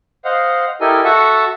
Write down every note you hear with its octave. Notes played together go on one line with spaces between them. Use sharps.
C5 D#5 F5 F#5
E4 G4 A4 A#4 D#5 G#5
F#4 A4 E5 F#5 A5 C#6